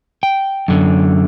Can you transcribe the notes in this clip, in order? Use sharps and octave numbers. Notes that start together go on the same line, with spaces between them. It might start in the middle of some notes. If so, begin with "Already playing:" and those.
G5
F#2 D3